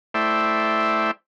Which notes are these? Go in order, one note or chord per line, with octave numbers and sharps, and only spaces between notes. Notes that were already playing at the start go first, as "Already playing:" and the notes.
A3 E4 C5 D5 E5 G5